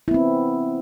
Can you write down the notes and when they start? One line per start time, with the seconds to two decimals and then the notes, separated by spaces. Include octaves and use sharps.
0.08 E4
0.11 B3
0.14 C4